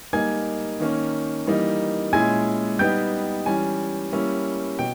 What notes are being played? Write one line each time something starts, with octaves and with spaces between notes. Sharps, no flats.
G3 A#3 D#4 G#5 G#6
D#3 A#3 C#4
E3 G3 A#3 D#4
A#2 G#3 C#4 E4 G#5 G#6
G3 B3 D#4 G5 G6
E3 G3 C#4 G#5
G3 A#3 C#4 E4
B2 G5